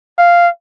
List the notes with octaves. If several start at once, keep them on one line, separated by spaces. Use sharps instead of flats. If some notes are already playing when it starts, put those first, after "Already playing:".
F5